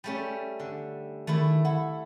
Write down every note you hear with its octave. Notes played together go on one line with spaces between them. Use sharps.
G3 A3 C#4
D3
D#3 A3 E4
E4 F#5